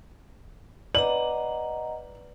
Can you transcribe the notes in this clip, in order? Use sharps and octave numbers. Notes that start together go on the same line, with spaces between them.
B4 D5 D#5 F#5 A#5 F#7